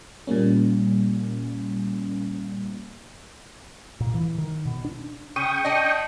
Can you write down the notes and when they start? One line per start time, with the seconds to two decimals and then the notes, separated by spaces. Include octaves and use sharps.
0.27 A#2 G3 A#3 C#4
4.00 A#2
4.14 E3
4.38 D#3
4.66 B2
4.85 D4
5.36 C#3 G5 C#6 D#6
5.65 D4 D#5